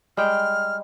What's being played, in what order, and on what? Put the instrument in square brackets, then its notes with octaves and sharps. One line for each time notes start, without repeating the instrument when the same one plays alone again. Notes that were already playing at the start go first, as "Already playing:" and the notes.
[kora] G3 G#3 G5 [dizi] F6